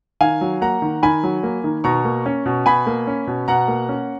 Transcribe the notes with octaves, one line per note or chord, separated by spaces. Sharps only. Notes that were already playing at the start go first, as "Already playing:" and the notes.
D#3 F5 G#5
F#3
A#3 F#5 A#5
D#3
D#3 G#5 B5
F#3
A#3
D#3
B2 A#5 C#6
A#3
C#4
B2
B2 G#5 B5
A#3
C#4
B2
B2 F#5 A#5
A#3
C#4